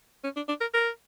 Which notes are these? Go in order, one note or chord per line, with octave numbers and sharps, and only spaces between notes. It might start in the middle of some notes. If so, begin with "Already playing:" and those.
C#4
D4
D4
A#4
A#4